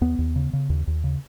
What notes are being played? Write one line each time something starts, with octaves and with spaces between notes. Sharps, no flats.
D#2 B3
D#2
C#3
C#3
D#2
D#2
C#3